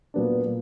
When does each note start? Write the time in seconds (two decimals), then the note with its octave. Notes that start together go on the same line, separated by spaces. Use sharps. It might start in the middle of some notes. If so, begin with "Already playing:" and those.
0.14 A#2 F#3 B3 D4
0.46 A#2 F#3